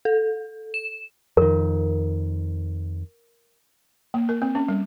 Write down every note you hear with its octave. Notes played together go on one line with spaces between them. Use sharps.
A4
E7
F2 D#3 A#4
A#3
A#4
C4
C#4
G3